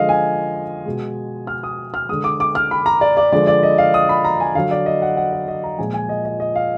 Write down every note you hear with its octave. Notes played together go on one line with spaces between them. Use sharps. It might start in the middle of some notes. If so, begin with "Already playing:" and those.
Already playing: D3 F3 G#3 D#5 F5
G#5
B2 G#3
F6
D#6
F6
D3 G#3 D#6
D6
D6
F6
B5
A#5
D5
D5
D3 F3 G#3 D5
D5
D#5
F5
D#6
B5
A#5
G#5
D3 F#3 F5
D5
D#5
F#5
F#5
D#5
D#5
A#5
A#2 F3 G#3 G#5
G#5
D#5
D#5
D#5
F5